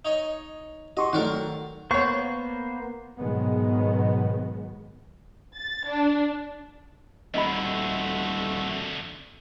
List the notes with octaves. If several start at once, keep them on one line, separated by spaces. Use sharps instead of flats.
D#4 C#5 D#5
F#4 D#5 C6 C#6
D#3 F#3 A3 A#4 D5 F#5
A#3 B3 C5 C#5 C#6
G#2 B2 D#3 F#3 G#3 B3
A6
D4
D#1 F2 D3 A3 F#4 D#5 E5 B5